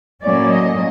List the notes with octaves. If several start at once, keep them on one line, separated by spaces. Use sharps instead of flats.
A2 F#3 A#3 C#4 D5
D#5